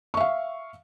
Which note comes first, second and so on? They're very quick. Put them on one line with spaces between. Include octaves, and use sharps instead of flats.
C#6 E5 F5